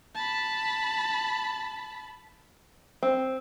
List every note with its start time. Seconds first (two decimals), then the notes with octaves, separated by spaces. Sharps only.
0.15 A5 B5
3.03 C4